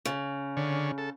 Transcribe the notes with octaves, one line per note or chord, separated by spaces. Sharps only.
C#3
D3 C#4
A4